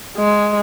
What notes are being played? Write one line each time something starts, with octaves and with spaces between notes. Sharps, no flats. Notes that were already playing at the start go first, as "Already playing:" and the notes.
G#3